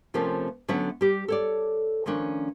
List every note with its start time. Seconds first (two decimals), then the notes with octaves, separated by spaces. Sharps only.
0.14 C3 F3 A3 A#3 C4 C#4
0.68 D3 F#3 B3 C#4 E5 F#5
1.01 G3 G4
1.28 A4 C#5 D5
2.06 D#3 F3 A3 C#4 D4